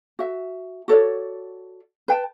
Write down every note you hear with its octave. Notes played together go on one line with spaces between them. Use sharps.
F#4 E5
F#4 A4 C#5 D5
B4 G5 A5